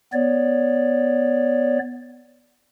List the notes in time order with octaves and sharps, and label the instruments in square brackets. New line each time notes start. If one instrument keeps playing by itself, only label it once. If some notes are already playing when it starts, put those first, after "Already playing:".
[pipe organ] B3 C#5 D5